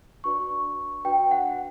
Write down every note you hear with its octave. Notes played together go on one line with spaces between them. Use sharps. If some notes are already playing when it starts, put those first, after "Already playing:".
D4 F#4 B4 D5 C#6
D4 F#4 B4 D5 G5
F#5